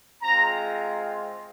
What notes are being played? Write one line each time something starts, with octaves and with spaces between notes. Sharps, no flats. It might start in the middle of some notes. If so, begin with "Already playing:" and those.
G#3 C4 F4 A#5